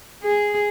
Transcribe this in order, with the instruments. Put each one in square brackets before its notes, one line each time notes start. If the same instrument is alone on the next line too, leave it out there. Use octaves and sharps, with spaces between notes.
[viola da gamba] G#4